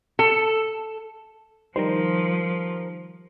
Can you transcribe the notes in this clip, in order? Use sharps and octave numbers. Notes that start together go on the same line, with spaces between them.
A4
D#3 F3 G3 A#4 C5